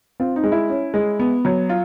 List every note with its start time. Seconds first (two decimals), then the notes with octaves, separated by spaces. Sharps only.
0.20 C4 F4
0.36 D#4
0.44 G#3
0.52 E4
0.70 C#4
0.94 G#3
1.19 B3
1.45 F#3
1.69 F4